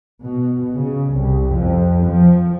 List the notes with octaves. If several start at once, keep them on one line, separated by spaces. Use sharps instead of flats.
B2
C#3
C2
F2
F3